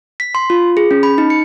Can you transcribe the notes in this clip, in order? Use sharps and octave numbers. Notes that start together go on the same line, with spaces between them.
B6
C6
F4
G#4
C#4
B5
D#4
C#7